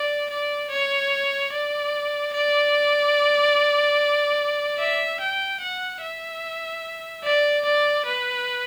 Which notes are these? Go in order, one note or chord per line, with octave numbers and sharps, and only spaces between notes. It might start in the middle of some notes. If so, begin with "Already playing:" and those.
Already playing: D5
D5
C#5
D5
D5
E5
G5
F#5
E5
D5
D5
B4